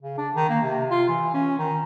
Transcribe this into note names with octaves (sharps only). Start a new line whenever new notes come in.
C#3
D4
D#3
A#3
C3
F4
E3
C#4
D#3